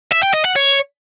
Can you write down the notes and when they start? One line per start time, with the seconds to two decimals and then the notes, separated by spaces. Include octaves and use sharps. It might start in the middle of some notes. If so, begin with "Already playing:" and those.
0.11 E5
0.22 G5
0.34 D#5
0.45 F#5
0.56 C#5